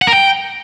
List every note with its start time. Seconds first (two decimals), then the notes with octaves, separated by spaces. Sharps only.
0.02 F#5
0.07 A#4
0.13 G5